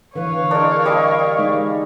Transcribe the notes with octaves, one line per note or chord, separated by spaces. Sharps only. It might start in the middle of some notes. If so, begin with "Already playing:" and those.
D3 E3 B4 C#5 F5
G#3 D4 A#4
G3 D#5 C#6
G#3 D#4